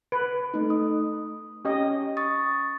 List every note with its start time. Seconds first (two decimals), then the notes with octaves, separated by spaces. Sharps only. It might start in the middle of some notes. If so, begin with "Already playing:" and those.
0.12 B4 D7
0.54 A3 D#4
0.70 D#6
1.65 C#4 G4 D#5
2.17 C#6 D#6 A6